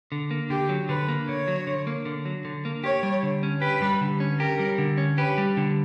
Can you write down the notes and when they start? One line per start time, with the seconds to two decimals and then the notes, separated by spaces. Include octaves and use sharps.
0.12 D3
0.31 A#3
0.50 D3 G4
0.69 F#3
0.89 D3 B4
1.08 A#3
1.28 D3 C#5
1.47 F#3
1.67 D3
1.87 A#3
2.06 D3
2.25 F#3
2.45 D3
2.65 A#3
2.84 G4 C#5
3.03 G3
3.23 D3
3.43 C#4
3.61 G4 B4
3.82 G3
4.01 D3
4.20 C#4
4.39 G4 A#4
4.59 G3
4.78 D3
4.98 C#4
5.17 G4 B4
5.38 G3
5.57 D3